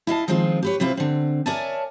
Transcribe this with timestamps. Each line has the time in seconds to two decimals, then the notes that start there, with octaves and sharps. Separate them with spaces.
0.07 E4 D#5 F5 A5
0.28 D#3 F3 G#3 C4 F4
0.63 G4 B4 C#5
0.80 C3 C4 E4 F4 B4
0.97 D3 C4
1.46 A#4 C#5 D5 E5 G#5 A5